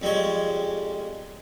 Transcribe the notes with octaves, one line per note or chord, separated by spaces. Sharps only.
F2 G3 G#3 C#5